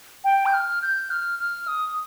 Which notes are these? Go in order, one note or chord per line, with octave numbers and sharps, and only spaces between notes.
G5
G6
F6
G6
F6
F6
D#6